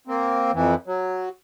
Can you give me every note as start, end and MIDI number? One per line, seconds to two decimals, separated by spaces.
0.07 0.51 58
0.07 0.51 60
0.53 0.75 41
0.53 0.75 52
0.86 1.29 54